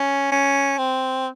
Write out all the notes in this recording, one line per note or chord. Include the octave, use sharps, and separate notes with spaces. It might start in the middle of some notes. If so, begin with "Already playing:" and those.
Already playing: C#4
C#4
C4